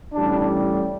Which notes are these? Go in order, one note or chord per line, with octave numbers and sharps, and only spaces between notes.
A1 A2 G3 D4